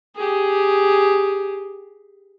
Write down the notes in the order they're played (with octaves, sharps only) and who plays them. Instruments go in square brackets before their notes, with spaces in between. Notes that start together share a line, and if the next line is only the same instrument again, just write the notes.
[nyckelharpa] G4 G#4